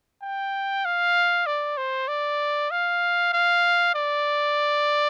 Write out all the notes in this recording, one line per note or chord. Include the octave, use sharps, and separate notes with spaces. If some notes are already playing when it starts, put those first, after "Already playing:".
G5
F5
D5
C5
D5
F5
F5
D5